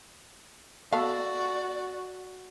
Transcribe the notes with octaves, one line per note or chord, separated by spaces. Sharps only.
B3 F#4 A4 D5 F5 A5